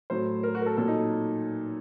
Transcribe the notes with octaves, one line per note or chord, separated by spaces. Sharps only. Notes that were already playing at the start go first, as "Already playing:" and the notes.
A2 F#3 C5
A#4
F#4
A#4
A4
A#2 F#3 A4
D#4